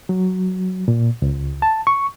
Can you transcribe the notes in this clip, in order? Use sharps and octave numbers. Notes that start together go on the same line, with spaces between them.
F#3
A#2
C#2
A5
C#6